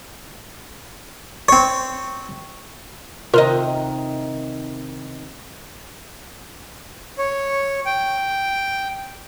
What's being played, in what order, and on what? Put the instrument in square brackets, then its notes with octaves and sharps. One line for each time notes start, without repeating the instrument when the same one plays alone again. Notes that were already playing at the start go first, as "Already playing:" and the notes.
[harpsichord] C4 C#5
[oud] C3 D#3 D#5 [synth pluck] F4 A#4
[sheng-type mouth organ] C#5
G5